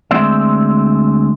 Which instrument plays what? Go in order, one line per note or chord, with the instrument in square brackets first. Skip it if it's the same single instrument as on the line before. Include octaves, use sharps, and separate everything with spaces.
[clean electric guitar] D2 G#3 C4 C5 D5 E5